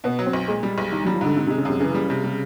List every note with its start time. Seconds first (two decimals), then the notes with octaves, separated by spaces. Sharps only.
0.04 B2 B3
0.19 F#3
0.26 C4
0.33 B1
0.48 A#2 G#3
0.63 G3
0.78 B1
0.92 D#3 G3
1.04 F#3 G3
1.14 F3
1.21 G#2 D3
1.36 C3 D#3
1.47 C3 G#3
1.58 C#3
1.65 F#2 C3
1.80 C#3 E3
1.95 G3
2.10 C3
2.24 G3